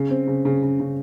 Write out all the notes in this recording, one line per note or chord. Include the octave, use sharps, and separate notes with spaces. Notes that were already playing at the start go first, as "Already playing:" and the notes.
Already playing: C#3
C4
C#3
C#3
C#3
C#3